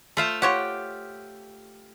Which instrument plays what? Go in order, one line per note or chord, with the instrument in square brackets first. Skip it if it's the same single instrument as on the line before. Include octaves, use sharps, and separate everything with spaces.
[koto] A3 F4 C5
[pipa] F4 C#5 F#5 [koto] G4